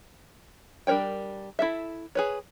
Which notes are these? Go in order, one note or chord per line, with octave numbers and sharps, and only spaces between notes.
G3 D4 A#4 C#5 G5
E4 A4 E5
G#4 B4 C#5